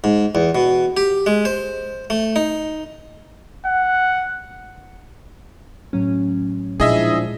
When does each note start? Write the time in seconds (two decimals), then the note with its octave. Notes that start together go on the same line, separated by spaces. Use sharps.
0.04 G#2
0.35 E2
0.55 B2
0.97 G4
1.26 G#3
1.45 C5
2.10 A3
2.36 D#4
3.66 F#5
5.93 A2 F#3 C#4
6.80 A#2 F3 G#3 D4 E4 G#4 D#5 E5